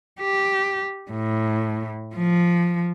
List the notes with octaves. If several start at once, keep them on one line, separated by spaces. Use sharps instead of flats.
G4
A2
F3